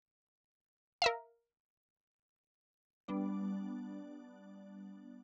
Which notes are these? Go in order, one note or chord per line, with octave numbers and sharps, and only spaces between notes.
A#4 E5 F5
G3 B3 D4 D5